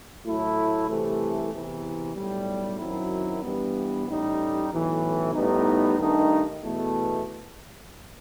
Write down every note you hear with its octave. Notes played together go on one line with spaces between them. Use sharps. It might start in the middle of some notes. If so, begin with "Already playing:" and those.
A2 F#3 A3 E4
C2 C3 E3 A3
E2 C3 E3
B1 A2 G3
F#2 D#3 F#3 C4 E4
G2 E3 G3 B3
A1 A2 G3 D#4
B1 A2 E3
A2 G3 B3 D#4
G2 D#3 A3 D#4
E2 B2 A3